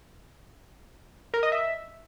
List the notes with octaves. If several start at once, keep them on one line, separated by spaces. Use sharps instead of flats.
A#4
D#5
E5